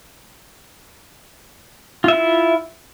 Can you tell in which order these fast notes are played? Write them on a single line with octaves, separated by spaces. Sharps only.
F4 E5 E4